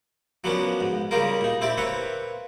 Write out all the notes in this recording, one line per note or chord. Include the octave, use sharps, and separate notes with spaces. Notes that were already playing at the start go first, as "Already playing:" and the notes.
F3 F#3 A#3 B3 C#4 D4
G#2
C#3 G3 A#3 D#4 F4 A#4
A#2 D#4
C4 E4 G4 D5
A#3 C4 B4 C#5